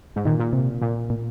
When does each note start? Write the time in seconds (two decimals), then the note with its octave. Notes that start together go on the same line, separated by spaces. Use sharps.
0.16 G#2
0.25 A#2 D#3
0.40 A#2
0.53 C3
0.82 A#2
1.10 A#2